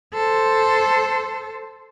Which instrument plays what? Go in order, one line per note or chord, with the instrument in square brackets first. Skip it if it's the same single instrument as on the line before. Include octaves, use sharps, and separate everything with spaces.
[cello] A4 C5